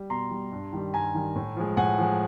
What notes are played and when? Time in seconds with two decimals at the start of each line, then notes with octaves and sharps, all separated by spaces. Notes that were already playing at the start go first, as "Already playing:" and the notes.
Already playing: G3
0.10 B2 A#5 C6
0.31 G3
0.52 G2
0.73 D#3 G3
0.94 G2 G#5 A#5
1.14 D#3 G3
1.35 A2
1.56 F3 G#3
1.77 A2 F#5 G#5
1.98 F3 G#3